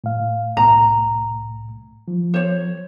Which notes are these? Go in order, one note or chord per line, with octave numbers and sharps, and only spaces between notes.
A2 F5
C2 A2 A#5
F3
C5 C#5